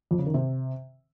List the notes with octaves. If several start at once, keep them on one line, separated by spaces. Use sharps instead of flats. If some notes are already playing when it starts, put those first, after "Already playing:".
F2
C#3
D#3
C3